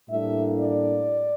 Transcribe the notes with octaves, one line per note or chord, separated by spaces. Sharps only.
A2 G3 A#3 D4 E5
D5